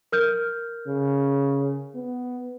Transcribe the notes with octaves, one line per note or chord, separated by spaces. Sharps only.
A#4 F6 G6
C#3
B3